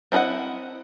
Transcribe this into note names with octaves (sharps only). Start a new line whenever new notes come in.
C4 E4 A#4 D#5 F#5